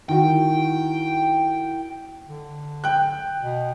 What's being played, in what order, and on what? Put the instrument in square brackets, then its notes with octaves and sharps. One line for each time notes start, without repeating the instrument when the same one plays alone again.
[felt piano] D#3 F#4 [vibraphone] E4 [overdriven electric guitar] G5
[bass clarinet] D3
[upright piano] G5 F#6
[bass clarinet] B2